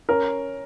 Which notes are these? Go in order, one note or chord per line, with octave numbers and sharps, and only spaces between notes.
C#4 A#4